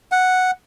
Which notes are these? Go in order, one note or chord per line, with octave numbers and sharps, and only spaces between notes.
F#5